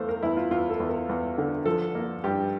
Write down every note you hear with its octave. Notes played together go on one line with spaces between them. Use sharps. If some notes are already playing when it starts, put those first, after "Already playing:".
Already playing: E2 A3 C5 F5
A#4
E2 E4
F4
E2 F4
A4
E2
A#4
E2
D3
F3 A4
A#3
G2 G4